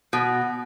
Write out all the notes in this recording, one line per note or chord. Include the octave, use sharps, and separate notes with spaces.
B2